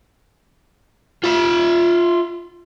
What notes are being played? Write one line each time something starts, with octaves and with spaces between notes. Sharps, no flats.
F4 E5